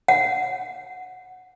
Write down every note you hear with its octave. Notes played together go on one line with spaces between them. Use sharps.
F#5